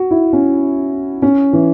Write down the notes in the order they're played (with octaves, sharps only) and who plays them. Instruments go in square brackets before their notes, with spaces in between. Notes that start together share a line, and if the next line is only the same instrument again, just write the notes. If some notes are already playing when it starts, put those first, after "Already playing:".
Already playing: [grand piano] F#4
E4
C#4
C#4
E3